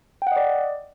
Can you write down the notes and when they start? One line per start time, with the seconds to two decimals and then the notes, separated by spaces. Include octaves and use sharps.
0.22 G5
0.27 F#5
0.32 D#5
0.36 D5